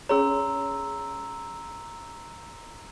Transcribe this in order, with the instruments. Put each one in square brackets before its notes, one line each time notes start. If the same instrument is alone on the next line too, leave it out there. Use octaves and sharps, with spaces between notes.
[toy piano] C#4 G#4 C#5 [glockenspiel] A#5 C6 E6